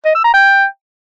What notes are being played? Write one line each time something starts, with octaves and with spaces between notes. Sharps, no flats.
D#5
E6
A#5
G5